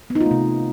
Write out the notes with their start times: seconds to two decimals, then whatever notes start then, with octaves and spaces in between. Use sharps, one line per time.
0.10 B3
0.15 D#4
0.21 F4
0.26 A3
0.31 C3